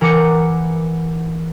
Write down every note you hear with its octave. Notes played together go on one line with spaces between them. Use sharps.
E3 A#4 F#5 D6 G6 C#7